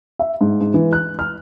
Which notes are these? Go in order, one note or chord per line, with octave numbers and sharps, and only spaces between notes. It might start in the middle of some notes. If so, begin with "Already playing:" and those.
E5
G#2
G#2
E3
F#6
F6